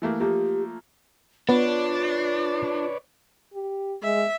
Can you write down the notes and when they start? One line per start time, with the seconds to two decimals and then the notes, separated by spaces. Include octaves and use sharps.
0.02 E3 A3 A#3
0.20 F3 A3 A#3 G4
1.49 B3 D4 F4 B4 C#5 D5
3.54 G4
4.03 G#3 E5